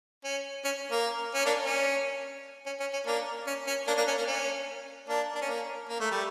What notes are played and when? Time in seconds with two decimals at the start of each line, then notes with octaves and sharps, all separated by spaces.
0.25 C#4
0.65 C#4
0.91 A#3
1.35 C#4
1.46 A#3 D4
1.66 C#4
2.66 C#4
2.80 C#4
2.93 C#4
3.06 A#3 D4
3.47 C#4
3.67 C#4
3.87 A#3 D4
3.97 A#3 D4
4.08 C#4
4.18 A#3
4.27 C#4
5.09 A#3 D4
5.35 D4
5.41 C#4
5.49 A#3
5.89 A#3
6.00 A3
6.12 G3